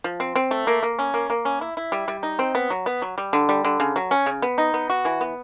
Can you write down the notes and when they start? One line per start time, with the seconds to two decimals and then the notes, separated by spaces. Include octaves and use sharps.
0.04 F3
0.20 C4
0.35 C4
0.51 A3
0.67 A#3
0.83 A#3
0.99 C#4
1.14 A#3
1.30 A#3
1.45 C#4
1.61 E4
1.77 E4
1.92 G3
2.08 G3
2.23 D#4
2.39 C4
2.55 B3
2.70 F#3
2.86 B3
3.02 F#3
3.18 G3
3.33 D3
3.49 G3
3.65 D3
3.80 C#3
3.96 F#3
4.11 C#4
4.26 C#3
4.42 B3
4.58 D#4
4.74 B3
4.90 F#4
5.05 E3
5.21 B3